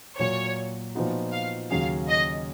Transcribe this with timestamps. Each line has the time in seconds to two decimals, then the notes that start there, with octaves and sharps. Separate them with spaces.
0.19 A#2 F#3 A#3 C#5
0.95 A#2 F3 B3 D#4 F#4
1.33 F5
1.70 D#2 C#3 F#3 C#4 G#4 F5
2.08 D#5